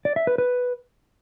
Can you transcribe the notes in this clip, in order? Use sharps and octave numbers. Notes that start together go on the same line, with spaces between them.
D5
E5
B4
B4